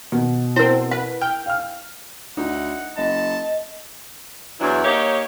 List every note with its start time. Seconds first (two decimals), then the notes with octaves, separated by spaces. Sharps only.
0.12 B2 D#3
0.56 C4 E4 A#4 C5
0.91 B4 F#5
1.21 G5 F6
1.46 F5 F6
2.37 D2 D#4 F#5
2.97 F#1 D#5 A5
4.60 E2 E3 F#3 D4 E4
4.84 A#3 D#4 G4 C#5